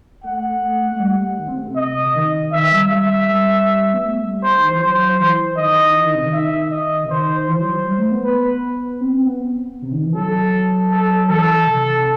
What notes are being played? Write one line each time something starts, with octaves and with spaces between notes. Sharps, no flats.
A3 F#5
A3
A3
G3
D#3
C4
A3
C3
D#5
C3
D#3
D#3 E5
G3
G3 E5
G3
B3
A3
G3
C5
D#3
E3
F#3 C5
E3
D#3 D#5
E3
D#3
C3
D#3
E5
D#5
C3
D#3 C5
E3 C5
F#3
G3
A3
B3
B4
C4
C4
B3
C3
D#3
E3
F#3 A4
A4
E3 A4
C3